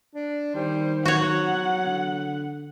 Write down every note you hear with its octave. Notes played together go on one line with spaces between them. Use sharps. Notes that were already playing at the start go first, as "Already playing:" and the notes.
D4
D#3 G3 C5
F#3 F#4 C#5 F#5
D3